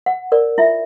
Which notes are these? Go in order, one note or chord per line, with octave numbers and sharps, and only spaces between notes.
F#5
A#4 D5
E4 F4 E5